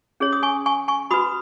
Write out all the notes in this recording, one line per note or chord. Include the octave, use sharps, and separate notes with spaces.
C#4 G#4 C#5
D#6
G#5 C#6
G#5 C#6
G#5 C#6
F#4 B4 B5 D#6